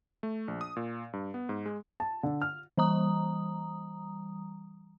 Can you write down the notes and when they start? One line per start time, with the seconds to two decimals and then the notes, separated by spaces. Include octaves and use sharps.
0.23 A3
0.48 A#1
0.61 D#6
0.76 A#2
1.13 G2
1.34 B3
1.49 G#2
1.66 G#3
2.00 A5
2.23 D3
2.42 F6
2.78 E3 G3 A#5 D#6